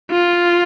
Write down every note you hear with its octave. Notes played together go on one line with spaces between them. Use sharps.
F4